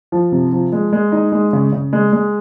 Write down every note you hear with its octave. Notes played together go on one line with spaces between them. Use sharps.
F3
C3
F3
G#3
G#3
D#4
G#3
C#3
C#3
G#3
G#3